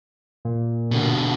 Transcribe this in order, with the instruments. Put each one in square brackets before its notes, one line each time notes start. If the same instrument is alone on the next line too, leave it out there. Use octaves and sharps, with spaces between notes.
[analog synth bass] A#2
[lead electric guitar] B2 D3